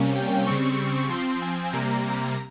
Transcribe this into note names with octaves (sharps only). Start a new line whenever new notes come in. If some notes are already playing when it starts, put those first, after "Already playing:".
Already playing: C3 G3 A#3 C#4
G5
C#3 G3 C4 C#6
F3 C4 C6
G#5
C3 G3 A#3 A#5